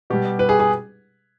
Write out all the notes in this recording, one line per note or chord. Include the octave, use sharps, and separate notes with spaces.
B2 G3 G4
B4
G#4
G#4